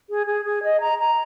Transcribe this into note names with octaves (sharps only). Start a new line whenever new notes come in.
G#4
G#4
G#4
D#5
A#5
A#5